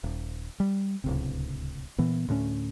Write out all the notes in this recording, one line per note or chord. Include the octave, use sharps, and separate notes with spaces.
D#1
G3
D1 C#2 C3
A#2 E3 B3
D2 A2 C4 C#4